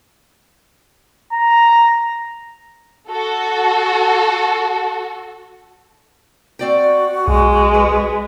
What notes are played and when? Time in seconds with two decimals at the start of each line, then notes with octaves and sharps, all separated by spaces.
1.33 A#5
3.09 F#4 A4
6.59 C4 F#4 D5 G5
7.28 B1 G#3
7.74 F2 B4